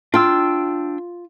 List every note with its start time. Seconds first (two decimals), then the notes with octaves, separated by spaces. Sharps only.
0.14 D4 F4 G5 E6